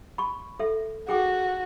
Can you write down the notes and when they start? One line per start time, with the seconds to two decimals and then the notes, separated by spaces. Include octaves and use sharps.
0.18 B5 C#6
0.59 A4 E5
1.09 F#4 G#4 G5 D6